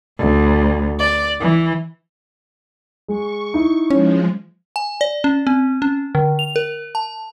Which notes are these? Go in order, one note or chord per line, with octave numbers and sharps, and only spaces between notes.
D2
D5
E3
G#3 C#6
D#4 E4
F3 G#3 C#4
G#5
D5
C#4
C4
C#4
D3
F7
A#4
A5